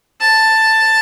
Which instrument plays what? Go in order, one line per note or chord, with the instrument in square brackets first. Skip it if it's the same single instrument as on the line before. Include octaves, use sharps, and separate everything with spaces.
[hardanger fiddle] A5